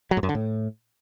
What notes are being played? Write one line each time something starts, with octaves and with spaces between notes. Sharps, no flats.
F#3
G#2
F#2
D3
A2